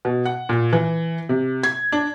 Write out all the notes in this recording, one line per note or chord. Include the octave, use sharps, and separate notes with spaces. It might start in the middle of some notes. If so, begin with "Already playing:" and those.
B2
F#5
A#2
E3
C3
G#6
D4